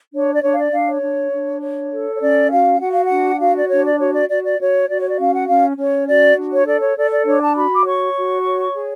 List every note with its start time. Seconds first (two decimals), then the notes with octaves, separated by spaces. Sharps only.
0.13 D4 C#5
0.34 D5
0.43 D4 C#5
0.53 F5
0.58 D5
0.72 D4 F5
0.88 C#5
1.02 D4
1.32 D4
1.61 C#5
1.92 A4
2.15 C#5
2.21 C#4 D5
2.51 F#4 F5
2.80 F#4 F#5
2.92 F5
3.04 F#5
3.10 D4
3.40 F#4 F5
3.55 D5
3.69 D4 C#5
3.85 D5
3.99 F#4 C#5
4.14 D5
4.29 F#4 D5
4.43 D5
4.59 F#4 C#5
4.89 F#4 D5
5.00 C#5
5.08 D5
5.18 C#4 F5
5.33 F#5
5.48 C#4 F5
5.77 C#4 C#5
6.08 F#4 D5
6.37 D4
6.52 C#5
6.66 A4 D5
6.81 C#5
6.97 A4 D5
7.11 D5
7.26 D4 C#5
7.41 A5
7.56 F#4 B5
7.74 D6
7.85 C#5 C#6
8.16 F#4
8.45 C#5
8.75 G#4